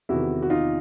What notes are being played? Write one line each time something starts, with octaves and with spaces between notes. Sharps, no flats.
E2 C3 D#3 E4 F#4
F#4
D#4 F4